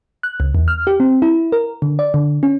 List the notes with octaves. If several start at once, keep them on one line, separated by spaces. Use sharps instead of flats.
F#6
C#2
E2
F6
G4
C4
E4
A#4
D3
D5
D3
C#4